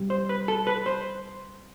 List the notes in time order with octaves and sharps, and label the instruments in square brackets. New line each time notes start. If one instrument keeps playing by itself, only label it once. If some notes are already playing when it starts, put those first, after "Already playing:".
Already playing: [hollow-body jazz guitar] C3 G3
C5
B4
A4
B4
C5